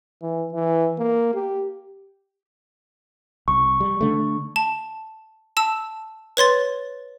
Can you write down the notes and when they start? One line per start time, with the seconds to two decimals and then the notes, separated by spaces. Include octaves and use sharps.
0.22 E3
0.53 E3
0.99 A#3
1.34 G4
3.48 C2 C#6
3.80 G3
4.01 D3 A3
4.56 A5
5.57 A5 E6
6.37 B4 C#5 C6 A6